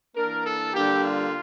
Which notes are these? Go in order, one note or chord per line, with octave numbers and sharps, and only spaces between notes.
E3 A#3 D4 A#4
A4
D3 G3 A#3 D4 G4
F4